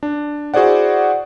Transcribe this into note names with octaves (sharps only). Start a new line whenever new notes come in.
D4
E4 F#4 G#4 C5 D5 F#5